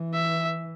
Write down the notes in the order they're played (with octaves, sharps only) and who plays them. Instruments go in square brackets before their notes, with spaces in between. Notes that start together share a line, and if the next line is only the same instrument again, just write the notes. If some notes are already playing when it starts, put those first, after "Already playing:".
Already playing: [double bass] E3
[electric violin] E5